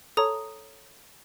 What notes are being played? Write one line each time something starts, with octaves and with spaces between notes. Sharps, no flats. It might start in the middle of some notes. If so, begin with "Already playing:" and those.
A4 C#5 A#5 D#6